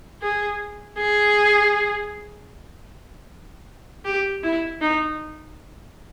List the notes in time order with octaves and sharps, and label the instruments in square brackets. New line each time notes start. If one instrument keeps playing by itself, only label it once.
[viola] G#4
G#4
G4
E4
D#4